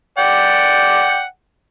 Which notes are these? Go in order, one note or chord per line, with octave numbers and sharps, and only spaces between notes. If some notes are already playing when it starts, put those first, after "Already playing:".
D5 F#5 G5